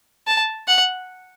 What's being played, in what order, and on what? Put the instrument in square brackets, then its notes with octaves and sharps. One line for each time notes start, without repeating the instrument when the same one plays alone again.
[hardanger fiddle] A5
F#5